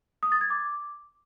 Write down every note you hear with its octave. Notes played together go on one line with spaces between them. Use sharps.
D#6
A6
G#6
D6